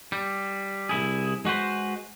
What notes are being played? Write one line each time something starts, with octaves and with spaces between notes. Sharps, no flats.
G3
C2 E4 G#4
G#3 F#4 B4 C5